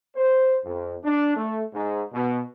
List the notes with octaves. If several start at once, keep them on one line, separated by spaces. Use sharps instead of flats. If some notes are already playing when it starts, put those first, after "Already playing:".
C5
F2
D4
A3
G#2
B2